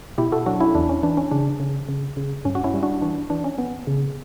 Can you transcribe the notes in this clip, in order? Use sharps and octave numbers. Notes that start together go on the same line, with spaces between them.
B2 E4 G4
F#4 A4
F#3 D4 F#4
C#4 E4
E2 D4
C#4
E3 D4
C#4
C#3 D4
C#3
C#3
C#3
G2 C#4
F#4
C#4 E4
G3
D4 F#4
E3 D4
E3 D4
C#4
B3
C#3